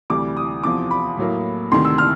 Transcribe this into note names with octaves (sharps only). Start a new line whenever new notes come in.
D2 C3 E3 G3 D6
D#6
E2 C3 F3 D6
B5
A2 F#3 A#3
D2 C3 D#3 C6
E6
F6